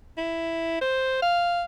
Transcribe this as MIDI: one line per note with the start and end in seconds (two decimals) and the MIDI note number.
0.17 0.80 64
0.81 1.21 72
1.22 1.64 77